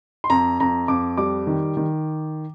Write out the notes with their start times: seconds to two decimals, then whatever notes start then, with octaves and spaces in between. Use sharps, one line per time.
0.24 C6
0.30 F2 A#5
0.60 F2 A#5
0.88 F2 D6
1.17 G3 D6
1.47 D#3
1.77 D#3